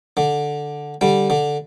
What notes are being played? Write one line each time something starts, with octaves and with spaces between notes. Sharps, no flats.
D3
D3 G3
D3